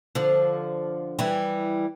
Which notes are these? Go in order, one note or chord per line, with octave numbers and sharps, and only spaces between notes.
D3 F3
E3 G3